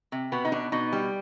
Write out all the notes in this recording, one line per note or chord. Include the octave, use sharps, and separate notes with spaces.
C3
B2 B3
D#4
B2 D4
B2 D#4
G3